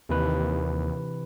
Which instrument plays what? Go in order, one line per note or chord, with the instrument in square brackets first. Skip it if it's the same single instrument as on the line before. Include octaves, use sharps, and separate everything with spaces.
[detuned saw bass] D#2 [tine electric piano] C3 E3 B4